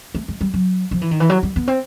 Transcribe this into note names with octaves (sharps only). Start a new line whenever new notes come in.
A3
G#3
G3
F#3
F3
E3
D#3
E3
F#3
G3
B3
C4